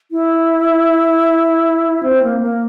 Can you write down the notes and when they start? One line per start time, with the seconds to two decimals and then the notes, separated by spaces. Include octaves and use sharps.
0.11 E4
2.03 C4
2.23 A#3
2.42 A#3